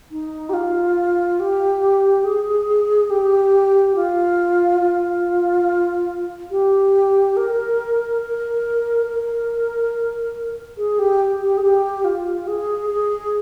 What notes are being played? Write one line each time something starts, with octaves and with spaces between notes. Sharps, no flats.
D#4
G4
F4
G4
G#4
G4
F4
F4
G4
A#4
A#4
A#4
G#4
G4
G4
G#4
G4
F4
G#4
G#4